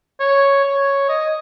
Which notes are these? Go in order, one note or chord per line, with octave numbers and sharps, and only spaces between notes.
C#5
C#5
D#5